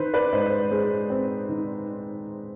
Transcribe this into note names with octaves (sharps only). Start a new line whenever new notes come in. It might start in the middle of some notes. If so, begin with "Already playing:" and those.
Already playing: D#3 B4 C5
B4 D5
G#2 C5 D#5
G#3
C4
D#3